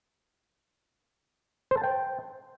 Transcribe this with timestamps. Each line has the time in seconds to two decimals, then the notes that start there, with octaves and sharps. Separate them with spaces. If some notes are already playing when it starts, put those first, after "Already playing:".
1.71 C5
1.77 A5
1.84 G5